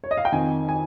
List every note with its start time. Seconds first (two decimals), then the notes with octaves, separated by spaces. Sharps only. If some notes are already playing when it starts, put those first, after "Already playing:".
0.04 C#5
0.11 D#5
0.17 F5
0.25 G5
0.32 F2 D#3 G#5
0.69 G#5